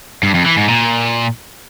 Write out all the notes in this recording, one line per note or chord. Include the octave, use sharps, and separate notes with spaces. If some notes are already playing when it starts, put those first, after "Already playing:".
G2
F2
E3
G#2
A#2